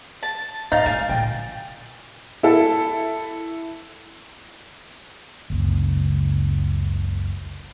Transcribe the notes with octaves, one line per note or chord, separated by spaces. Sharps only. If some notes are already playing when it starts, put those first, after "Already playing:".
A5
G#2 D#4 F5 A6
G#3 G#5
A#2 D3 G5
E4 A4
F#1 C#2